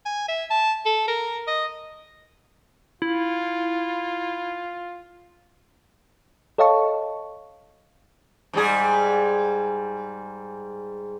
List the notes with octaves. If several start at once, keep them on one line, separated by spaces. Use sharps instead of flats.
G#5
E5
A5
A4
A#4
D#5
E4 F4
A4 C#5 D#5 F5 A5 C#6
G#2 G3 G#4